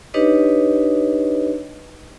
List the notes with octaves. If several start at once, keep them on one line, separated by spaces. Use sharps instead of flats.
D4 D#4 G4 B4 C#5 D#5